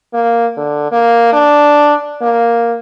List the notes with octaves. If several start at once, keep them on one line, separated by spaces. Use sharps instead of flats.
A#3
D3
A#3
D4
A#3